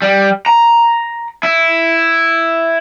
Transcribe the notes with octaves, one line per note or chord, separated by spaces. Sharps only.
G3
A#5
E4